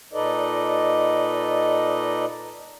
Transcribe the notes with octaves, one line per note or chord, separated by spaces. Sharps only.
A#2 D#4 A4 B4 D5 D#5